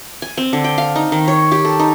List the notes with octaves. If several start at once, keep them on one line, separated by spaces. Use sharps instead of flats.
G#5
C4
D3
G5
F5
D#4
D#3
C#5
G4
A4
D#4